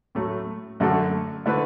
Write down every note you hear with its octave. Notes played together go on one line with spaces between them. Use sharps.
A2 F#3 A3
F#2 D3 A3 F#4 A4
D3 A3 E4 B4